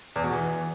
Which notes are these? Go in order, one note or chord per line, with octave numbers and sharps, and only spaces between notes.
E2
B2
E3